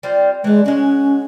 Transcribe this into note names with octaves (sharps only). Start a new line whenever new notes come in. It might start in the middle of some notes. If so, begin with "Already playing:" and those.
G3 C4 F4
E3 G#3 D4
G#3 C#4 F#4